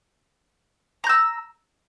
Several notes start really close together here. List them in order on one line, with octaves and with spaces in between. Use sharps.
A#5 G6 E6